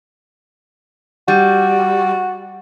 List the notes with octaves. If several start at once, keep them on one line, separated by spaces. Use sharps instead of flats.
G3 F#4